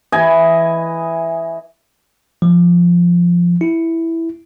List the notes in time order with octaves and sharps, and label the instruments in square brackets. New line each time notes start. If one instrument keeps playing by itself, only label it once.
[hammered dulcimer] E3 D#5 G#5
[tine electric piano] F3
E4